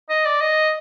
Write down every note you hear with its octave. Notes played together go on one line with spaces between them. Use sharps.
D#5
D5
D#5